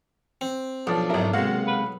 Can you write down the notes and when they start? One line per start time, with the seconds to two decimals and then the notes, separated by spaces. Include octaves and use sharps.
0.41 C4
0.87 B1 F3 D4
1.10 G#1 F#3 E4 A#4
1.33 C3 G#3 A#3 F#4 F5 F#5
1.67 B4